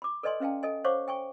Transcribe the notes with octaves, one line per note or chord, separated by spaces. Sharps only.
B5 D6
A4 B4 D5 D#5 G#5 C6
C#4 B4 F5 G5 A5
A4 D#5 G#5
C5 C#5 F5 F#5 C#6 D6
G5 G#5 C#6